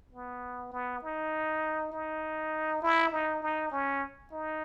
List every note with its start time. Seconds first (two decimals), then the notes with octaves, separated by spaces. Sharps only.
0.13 B3
0.72 B3
1.03 D#4
1.93 D#4
2.83 E4
3.12 D#4
3.42 D#4
3.72 C#4
4.32 D#4